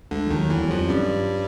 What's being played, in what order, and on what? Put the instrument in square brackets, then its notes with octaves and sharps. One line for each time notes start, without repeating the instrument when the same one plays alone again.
[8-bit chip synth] D2 D3 [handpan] G#3
[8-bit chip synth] D#2 D#3 [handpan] F3
[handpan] F#3
[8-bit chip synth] E2 E3
[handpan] G3
[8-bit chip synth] F2 F3
[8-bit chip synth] G2 G3 [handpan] C#4